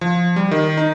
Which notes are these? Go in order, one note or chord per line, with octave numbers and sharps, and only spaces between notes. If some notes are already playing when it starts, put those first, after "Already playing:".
F3
G3
D#3
D#4